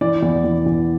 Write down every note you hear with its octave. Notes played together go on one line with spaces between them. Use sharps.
E3 D5
E2
E2
E2